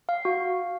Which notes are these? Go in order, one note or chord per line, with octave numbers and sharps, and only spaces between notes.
F5
F#4